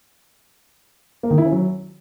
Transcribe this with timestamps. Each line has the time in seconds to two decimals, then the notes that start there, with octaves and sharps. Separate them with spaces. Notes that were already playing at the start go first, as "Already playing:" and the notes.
1.23 A#3
1.31 D#3
1.38 E4
1.45 C#4
1.52 F#3